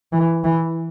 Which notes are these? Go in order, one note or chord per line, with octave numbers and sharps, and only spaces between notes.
E3
E3